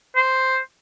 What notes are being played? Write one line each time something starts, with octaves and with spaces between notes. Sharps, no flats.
C5